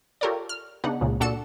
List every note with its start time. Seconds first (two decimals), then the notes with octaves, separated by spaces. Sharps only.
0.21 F4 G4 A4 A#4 C#5 D5
0.49 F6
0.84 C#3 B3 D4 D#4 F#5
1.01 C#2 A#2 C#3
1.20 A#2 D4 F#4 A4 C#7 E7